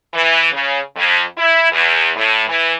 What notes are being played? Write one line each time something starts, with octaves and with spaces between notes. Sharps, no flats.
E3
C#3
F2
E4
E2
A2
E3